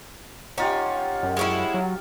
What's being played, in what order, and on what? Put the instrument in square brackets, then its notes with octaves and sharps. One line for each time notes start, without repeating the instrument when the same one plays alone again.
[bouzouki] C#4 [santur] D#4 F4 G4 [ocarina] F#5
[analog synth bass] F#2
[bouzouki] G#3 C#4 E4
[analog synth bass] F#3